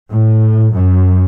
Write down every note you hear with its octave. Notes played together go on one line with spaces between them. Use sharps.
A2
F#2